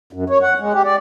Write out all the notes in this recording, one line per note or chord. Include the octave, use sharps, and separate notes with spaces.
F#2
C#5
F#5
G#3
G4
D5